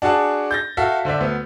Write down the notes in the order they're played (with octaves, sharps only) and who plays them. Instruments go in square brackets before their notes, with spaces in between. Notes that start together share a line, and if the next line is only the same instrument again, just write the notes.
[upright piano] D4 F#4 G#4 F#5 A5
G6 A6 A#6
F#4 A4 E5 F5
D3 C5 D5 E5
D2 B3